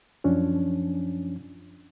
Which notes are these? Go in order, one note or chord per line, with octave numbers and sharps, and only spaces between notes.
F#2 F3 C#4 D4